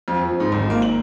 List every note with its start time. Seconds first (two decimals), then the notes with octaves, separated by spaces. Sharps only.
0.08 F2
0.24 F3
0.40 G#2
0.52 G#1
0.70 A#3
0.82 F#7